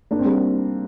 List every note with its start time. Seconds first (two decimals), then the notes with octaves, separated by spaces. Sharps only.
0.11 A#3 D4
0.19 C4
0.25 G3 A#3